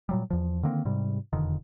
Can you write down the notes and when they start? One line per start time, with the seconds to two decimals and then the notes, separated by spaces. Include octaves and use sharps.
0.09 A#2 F#3 G3
0.30 E2 F3
0.63 D3 D#3 A#3 C4
0.85 G#2 C3 G3
1.33 E1 F2 D3 D#3